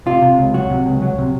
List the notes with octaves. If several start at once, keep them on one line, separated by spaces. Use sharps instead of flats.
C3 F4
C3
C#2
F#3 F#4
C3
C#2
F#3
C3